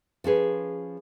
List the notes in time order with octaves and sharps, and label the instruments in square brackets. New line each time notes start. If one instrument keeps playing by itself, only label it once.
[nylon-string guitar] F3 C#4 G#4 B4